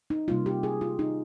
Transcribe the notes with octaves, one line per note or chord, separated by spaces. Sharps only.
D#4
C3 G3 A#3 F4
G4
G#4
F4
D#4